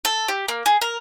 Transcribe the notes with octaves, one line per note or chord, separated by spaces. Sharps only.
A4
G4
A#3
G#4
A#4